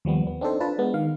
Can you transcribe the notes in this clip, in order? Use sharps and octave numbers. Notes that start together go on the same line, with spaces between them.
D#2 F3 G3 B3
B3
C4 D4 D#4 A4 C5
D4 F4 B4 A5
G#3 B3
D#3 F5